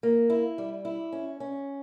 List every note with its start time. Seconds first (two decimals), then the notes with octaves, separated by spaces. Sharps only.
0.03 A#3
0.30 E4
0.58 G3
0.85 E4
1.12 C#4
1.40 C#4